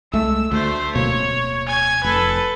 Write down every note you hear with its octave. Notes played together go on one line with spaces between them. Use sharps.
C2 G#3 A3 E6
D2 A3 C5
D1 B2 A#3 C#5
G#5 G#6
F1 A4 B4